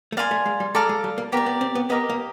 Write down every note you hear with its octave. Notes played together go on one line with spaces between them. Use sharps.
A3
A#3 D5 F5 G#5 C6
A3
G#3
G3
G#3 A4 D5 F5 A#5
G#3
G3
A#3
B3 G4 A#4 D5
B3
C4
B3
B3 G4 A#4 D#5
A#3